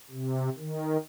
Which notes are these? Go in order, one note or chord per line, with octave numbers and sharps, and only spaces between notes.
C3
D#3